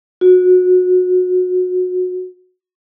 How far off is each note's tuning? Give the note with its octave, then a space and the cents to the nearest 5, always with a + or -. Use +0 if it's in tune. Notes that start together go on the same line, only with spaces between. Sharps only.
F#4 -25